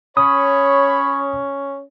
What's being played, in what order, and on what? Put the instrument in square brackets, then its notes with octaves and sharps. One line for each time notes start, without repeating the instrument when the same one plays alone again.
[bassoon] C#4 [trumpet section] C#5 [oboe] B5 [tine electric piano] D#6